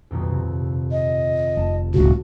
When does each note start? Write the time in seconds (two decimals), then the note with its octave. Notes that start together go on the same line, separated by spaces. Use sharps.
0.11 D#1 B1 F2
0.31 C3
0.92 D#5
1.57 F1 A5
1.94 D1 G1 C#2 F#4